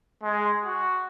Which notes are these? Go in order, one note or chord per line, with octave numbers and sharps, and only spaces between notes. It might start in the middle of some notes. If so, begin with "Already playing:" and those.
G#3
F#4